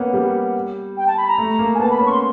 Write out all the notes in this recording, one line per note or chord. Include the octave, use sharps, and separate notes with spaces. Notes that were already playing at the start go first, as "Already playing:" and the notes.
Already playing: A#3 B3 C#4 F#5
G3
G5
A5
B5
A#5
A3
A#3
G#5
B3 A5
B5
C#4
C#6
C6